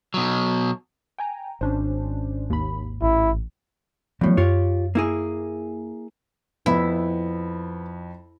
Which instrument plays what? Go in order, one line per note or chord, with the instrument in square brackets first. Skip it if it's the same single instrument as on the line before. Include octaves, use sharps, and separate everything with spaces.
[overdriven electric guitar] B2 F#3
[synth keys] G5 G#5 A#5
[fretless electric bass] G#1 [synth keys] C#4 D4 C5
[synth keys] D#2 B5
[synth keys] A1 [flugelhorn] E4
[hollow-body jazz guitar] E2 A2 [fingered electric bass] F3 F#3
[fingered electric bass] F#2 [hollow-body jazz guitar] F4 G4 C#5
[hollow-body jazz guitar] A#3 E4 G#4
[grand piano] F2 [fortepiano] B3 [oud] E4